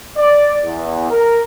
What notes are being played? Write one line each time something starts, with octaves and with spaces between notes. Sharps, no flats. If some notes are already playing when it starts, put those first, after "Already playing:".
D5
E2
A#4